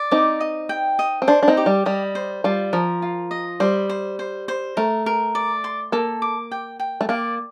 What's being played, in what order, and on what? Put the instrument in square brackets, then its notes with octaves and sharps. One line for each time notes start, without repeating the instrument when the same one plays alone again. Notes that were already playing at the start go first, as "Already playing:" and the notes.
Already playing: [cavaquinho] D5
[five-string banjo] C4 D#4 [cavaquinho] D6
[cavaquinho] D#5
G5
D#5
[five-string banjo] C4
[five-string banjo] D4 [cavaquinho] C5
[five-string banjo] D4
C4 D#4
[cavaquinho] G4
[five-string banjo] G3
[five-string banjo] G3 [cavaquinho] D#5
[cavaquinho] C5
[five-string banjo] G3 [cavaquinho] F4
[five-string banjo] F3 [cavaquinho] A#4
[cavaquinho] F4
D#5
[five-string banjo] G3 [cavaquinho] C5
[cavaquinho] C5
C5
C5
[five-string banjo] A3 [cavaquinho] A#4
[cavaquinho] A#4
D5
C6
[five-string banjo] A#3 [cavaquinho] A4
[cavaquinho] D6
G5
G5
[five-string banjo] A3
[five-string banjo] A#3 [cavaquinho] D5